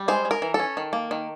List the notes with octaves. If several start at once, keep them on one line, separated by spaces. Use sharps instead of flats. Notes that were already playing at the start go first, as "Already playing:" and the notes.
Already playing: G3
G#3 C5
G#3
A#4
E3
A4
C#4
D#3
A#3
D#3